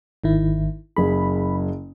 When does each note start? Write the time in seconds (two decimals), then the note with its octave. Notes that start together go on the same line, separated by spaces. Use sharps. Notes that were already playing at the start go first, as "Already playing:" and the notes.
0.24 G#1 D#3 E4
0.97 F#1 G#4 B5